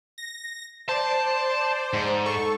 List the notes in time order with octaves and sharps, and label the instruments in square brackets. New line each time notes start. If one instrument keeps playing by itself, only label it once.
[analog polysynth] A#6
[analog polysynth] C5 D5 [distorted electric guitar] A5
[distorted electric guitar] G#2
[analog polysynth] A4 C#6